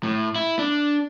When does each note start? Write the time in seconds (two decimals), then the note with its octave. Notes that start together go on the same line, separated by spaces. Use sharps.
0.03 A2
0.36 E4
0.59 D4